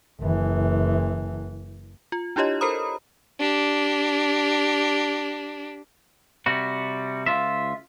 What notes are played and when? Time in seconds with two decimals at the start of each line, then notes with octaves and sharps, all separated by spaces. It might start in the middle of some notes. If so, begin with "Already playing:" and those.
0.21 F#1 E3
2.12 F4
2.36 D4 E4 F4 G4 C#5 D#5
2.61 A4 A#4 C5 A#5 B5 D#6
3.39 D4 G4
6.46 C3 G3 F#4
7.26 C#2 F4 E5